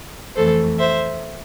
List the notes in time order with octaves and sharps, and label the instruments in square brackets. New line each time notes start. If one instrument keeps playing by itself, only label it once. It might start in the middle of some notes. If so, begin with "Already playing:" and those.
[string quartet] F2 E3 A3 A4 C5
C5 E5